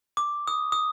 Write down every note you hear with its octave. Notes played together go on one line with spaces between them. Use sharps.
D6
D#6
D#6